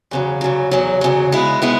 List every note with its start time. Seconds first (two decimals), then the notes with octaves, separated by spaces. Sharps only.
0.11 E2 C#3 F#3
0.41 E2 C#3 F#3
0.71 E2 C#3 F#3
1.01 E2 C#3 F#3
1.32 G#3 B3 E4
1.62 G#3 B3 E4